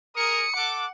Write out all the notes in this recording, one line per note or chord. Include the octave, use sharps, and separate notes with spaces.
G#4 A#4 D#6 C#7
A4 F#5 D6